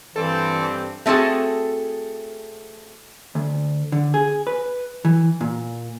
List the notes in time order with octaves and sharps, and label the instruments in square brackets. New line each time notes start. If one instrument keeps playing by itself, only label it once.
[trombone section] G2 C4 [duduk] E3 [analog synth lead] A4
[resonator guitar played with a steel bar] A3 C4 F#4 G#4 A4
[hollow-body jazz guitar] D2
D3
G#4
B4
E3
A#2